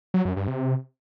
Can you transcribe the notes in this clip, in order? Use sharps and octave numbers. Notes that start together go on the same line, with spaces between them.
F#3
F#2
G2
C3